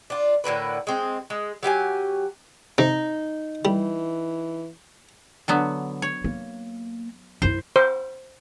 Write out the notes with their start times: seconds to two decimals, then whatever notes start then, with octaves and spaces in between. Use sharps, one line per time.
0.10 D4 F4
0.44 A2 D3 A#4 B4
0.87 G#3 C4
1.30 G#3
1.63 F#3 G4 F5 G#5
2.78 C3 D#4
3.65 E3 G3
5.48 D3 F#3 B3
6.02 C#5
6.24 A#3
7.42 F#2 E4 C5
7.76 C5